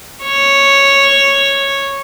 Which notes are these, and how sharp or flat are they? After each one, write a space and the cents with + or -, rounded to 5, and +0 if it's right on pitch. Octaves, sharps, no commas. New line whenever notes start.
C#5 -5